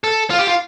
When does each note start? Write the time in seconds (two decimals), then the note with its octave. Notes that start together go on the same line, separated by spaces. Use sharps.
0.04 A4
0.30 F4
0.38 G4
0.47 F4